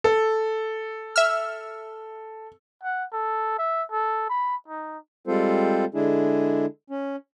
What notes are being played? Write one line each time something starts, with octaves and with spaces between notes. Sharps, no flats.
A4
E5 E6 F6
F#5
A4
E5
A4
B5
D#4
G3 G#3 C4 F4 A4 C5
D3 G#3 D4 E4 G#4
C#4